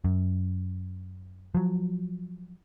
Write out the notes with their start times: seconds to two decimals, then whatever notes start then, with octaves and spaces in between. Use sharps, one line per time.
0.04 F#2
1.55 F3 F#3